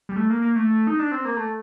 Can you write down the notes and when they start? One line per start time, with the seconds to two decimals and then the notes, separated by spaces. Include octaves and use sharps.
0.09 G3
0.16 A3
0.30 A#3
0.42 A#3
0.56 A3
0.87 D#4
0.99 D4
1.12 C4
1.25 A#3
1.37 A3